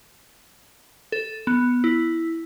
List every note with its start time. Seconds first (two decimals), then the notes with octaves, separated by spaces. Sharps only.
1.12 A4
1.47 B3
1.84 E4